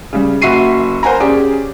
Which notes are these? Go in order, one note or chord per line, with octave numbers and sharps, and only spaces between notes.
C#3 G3
F#1 F#4 E5 C#6 C7 D#7
A#4 C5 F#5 G#5 A#5
C#4 G4 G#4 D5